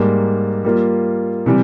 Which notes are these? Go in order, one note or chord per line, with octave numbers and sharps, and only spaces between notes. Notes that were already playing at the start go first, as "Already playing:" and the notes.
Already playing: G#2 G3 A#3
G3 A#3 F4
C3 E3 G3